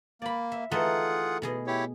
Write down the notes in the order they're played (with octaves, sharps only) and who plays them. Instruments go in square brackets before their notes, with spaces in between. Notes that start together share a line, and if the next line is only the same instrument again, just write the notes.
[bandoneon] A#3 [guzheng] D5 B5
[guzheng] E5
[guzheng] E3 A3 D#4 [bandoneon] F4 G#4 F#5
[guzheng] B2 G#4 D#5
[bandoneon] E4 G4 C#5